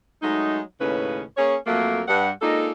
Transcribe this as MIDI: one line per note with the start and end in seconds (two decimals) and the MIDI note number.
0.22 0.61 54
0.22 0.61 56
0.22 0.61 57
0.22 0.61 63
0.80 1.23 39
0.80 1.23 45
0.80 1.23 49
0.80 1.23 61
0.80 1.23 71
1.37 1.56 58
1.37 1.56 61
1.37 1.56 68
1.37 1.56 73
1.66 2.02 41
1.66 2.02 54
1.66 2.02 57
1.66 2.02 58
2.08 2.30 43
2.08 2.30 78
2.42 2.72 56
2.42 2.72 58
2.42 2.72 62
2.42 2.72 63
2.42 2.72 65
2.42 2.72 69